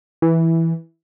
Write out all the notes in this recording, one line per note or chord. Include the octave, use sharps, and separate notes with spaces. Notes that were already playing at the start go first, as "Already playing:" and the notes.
E3